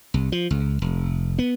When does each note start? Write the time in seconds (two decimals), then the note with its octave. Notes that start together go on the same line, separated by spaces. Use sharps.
0.14 C2
0.32 F3
0.51 C#2
0.82 F1
1.39 B3